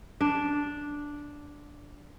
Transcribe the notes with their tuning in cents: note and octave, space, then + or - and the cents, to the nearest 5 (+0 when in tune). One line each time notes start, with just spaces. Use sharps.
D4 -5